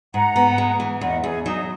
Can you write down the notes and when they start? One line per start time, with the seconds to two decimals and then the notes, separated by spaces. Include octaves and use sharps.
0.14 G#2 F#5 A#5
0.36 B3
0.58 G#3
0.80 E3
1.01 E2 D#5 F#5
1.24 E2 G#4
1.45 F#3 D#4